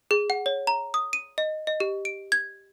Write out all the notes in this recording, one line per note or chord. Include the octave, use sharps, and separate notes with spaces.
G#4
F#5
C#5
A#5
D#6
D#7
D#5
D#5
G4
D7
G#6